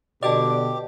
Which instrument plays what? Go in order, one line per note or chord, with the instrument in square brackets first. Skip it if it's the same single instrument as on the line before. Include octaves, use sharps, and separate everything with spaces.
[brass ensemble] B2 D3 [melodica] G4 [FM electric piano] D5 D6 [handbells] D#5 G5 A5